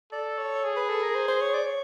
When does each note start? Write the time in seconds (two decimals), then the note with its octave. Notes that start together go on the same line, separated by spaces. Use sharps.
0.12 A4 D5
0.38 C#5
0.64 G#4
0.77 B4
0.89 A4
1.03 A#4
1.15 C5
1.28 C5
1.41 C#5
1.54 D5
1.66 C#5